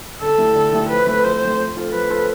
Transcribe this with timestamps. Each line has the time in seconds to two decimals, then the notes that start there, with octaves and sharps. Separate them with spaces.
0.21 D3 A4
0.38 A3 E4 G4
0.55 D3
0.73 A3 E4 G4
0.90 F3 B4
1.07 A3 C4
1.24 F3 C5
1.41 A3 C4
1.58 F3
1.76 C4 F4 A4 C5
1.93 F3 B4
2.10 C4 F4 A4 C5